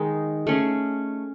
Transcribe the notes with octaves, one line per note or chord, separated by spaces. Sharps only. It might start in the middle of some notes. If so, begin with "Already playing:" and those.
Already playing: D#3 G#3 D#4
A3 C#4 G#4